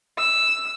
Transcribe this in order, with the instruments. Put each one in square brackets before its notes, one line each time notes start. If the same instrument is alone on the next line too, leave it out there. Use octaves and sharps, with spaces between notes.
[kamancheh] E6